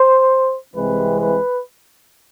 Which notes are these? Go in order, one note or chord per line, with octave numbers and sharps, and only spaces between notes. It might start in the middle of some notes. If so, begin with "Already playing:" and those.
Already playing: C5
C2 C3 E3 G#3 C4 B4
B4